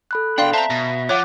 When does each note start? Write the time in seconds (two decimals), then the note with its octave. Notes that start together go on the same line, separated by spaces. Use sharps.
0.11 A4 B5 F#6
0.38 B2 D4 D5 F5 G5 C6
0.53 C4 E5 A5 A#5
0.70 B2 A#6
1.09 F3 C#5 F#5 D6 F#6